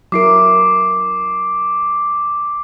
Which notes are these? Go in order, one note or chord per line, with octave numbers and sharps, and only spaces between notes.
F#3 E4 A#4 D6 C7 D7